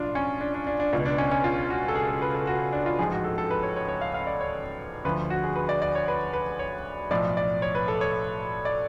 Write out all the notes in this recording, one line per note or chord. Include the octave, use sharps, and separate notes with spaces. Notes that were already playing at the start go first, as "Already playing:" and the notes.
Already playing: B1 A2 F3 D4 F4
C#4
D4
D4
D4
D4
C#2 B2 F4
D4
C#4
C#4
F4
F#4
A4
G#4
A4
B4
A4
F#4
D4
F4
A1 G#2 F3 G#4
F#4
A4
A4
B4
C#5
C#5
C#5
F5
F5
D5
C#5
D2 D3 F3 B4
F#4
G#4
B4
D5
D5
C#5
B4
B4
C#5
B1 A2 F3 D5
D5
C#5
B4
A4
C#5
D5